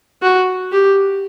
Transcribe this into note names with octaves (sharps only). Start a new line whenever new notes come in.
F#4
G4